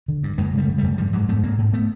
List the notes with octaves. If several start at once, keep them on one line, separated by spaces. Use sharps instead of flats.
D3
G2
F#2 G#3 A#3
C#3 G3 A3
C#3
F#2 G3 A3
G#2 F3 G3
G#2 F#3 G#3
G#2 A3 B3
G#2 A#3 C4
G#2
A3 B3